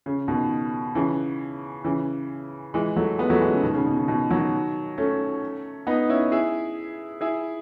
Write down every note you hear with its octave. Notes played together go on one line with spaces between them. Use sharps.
C#3
B2 D#3
C#3 E3
C#3 E3
E3 G#3
F#3 A3
G#3 B3
F#3 A3
E3 G#3
C#3
B2 D#3
C#3
B2
C#3
B2 D#3
D#3 F#3
A3 C#4
B3 D#4
C#4 E4
E4 G#4
E4 G#4